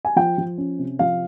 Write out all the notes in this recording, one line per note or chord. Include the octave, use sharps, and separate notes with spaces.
G#5
F3 G5
F3
C#4
C3
F3 F5